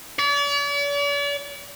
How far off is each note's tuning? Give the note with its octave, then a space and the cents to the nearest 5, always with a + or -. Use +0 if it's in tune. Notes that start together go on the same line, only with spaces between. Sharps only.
D5 -45